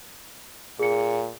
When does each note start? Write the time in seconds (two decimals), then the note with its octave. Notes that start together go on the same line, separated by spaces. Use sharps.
0.79 A#2 G#4 C#7